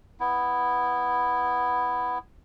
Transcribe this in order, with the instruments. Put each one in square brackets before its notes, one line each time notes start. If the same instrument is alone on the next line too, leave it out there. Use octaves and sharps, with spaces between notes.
[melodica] B3 E4